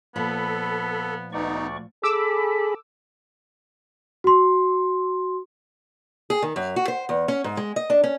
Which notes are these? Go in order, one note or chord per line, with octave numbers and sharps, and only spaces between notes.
A#2 F3 B3 A4 B5
D2 B3 D#4 D5 C#6
G#4 A4 B5 D6 E6
F#4 C6
G#4
D#3
F#2
F#4
C5
E2
C#4
G#2
G#3
D#5
D4
C#4